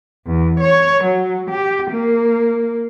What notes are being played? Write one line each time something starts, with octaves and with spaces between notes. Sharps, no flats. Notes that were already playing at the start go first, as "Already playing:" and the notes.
E2
C#5
F#3
G4
A#3